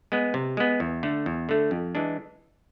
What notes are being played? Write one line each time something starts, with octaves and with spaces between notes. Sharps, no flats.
G#3 B3
C3
G#3 B3
E2
D3 A3
E2
D3 A3
F2
E3 G#3 D4